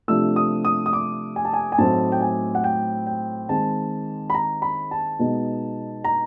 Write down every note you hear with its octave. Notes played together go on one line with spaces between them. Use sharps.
C3 F3 A3 D4 E6
D#6
D#6
D#6
D6
G#5
A5
G#5
G#5
A2 F#3 A3 C4 D#4 A5
G5
G#5
F#5
G5
G5
D#3 G#3 C4 A5
B5
A#5
B5
A5
B2 G#3 B3 D#4
A#5